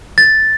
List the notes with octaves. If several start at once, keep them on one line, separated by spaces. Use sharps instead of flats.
A6